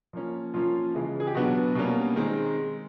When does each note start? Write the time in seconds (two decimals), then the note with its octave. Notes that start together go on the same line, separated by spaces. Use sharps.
0.13 F3 A#3 C#4
0.54 F3 A#3 C#4 F4
0.94 C#3 E3 G#3
1.20 G#4
1.27 G4
1.34 B2 F#3 B3 D4 F#4
1.75 B2 G3 A#3 C#4
2.16 D#3 G#3 C4